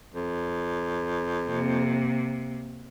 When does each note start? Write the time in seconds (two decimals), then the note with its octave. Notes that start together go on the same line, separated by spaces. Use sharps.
0.14 F2
1.47 C3 A#3